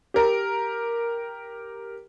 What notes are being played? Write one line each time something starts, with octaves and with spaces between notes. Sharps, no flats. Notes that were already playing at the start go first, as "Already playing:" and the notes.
G4 A#4